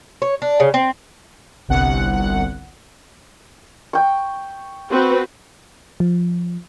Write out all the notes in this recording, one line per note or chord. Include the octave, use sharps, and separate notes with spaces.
C#5
D4
C#3
C4
G1 C2 F#5
G5 C#6
C4 F#4 B4
F3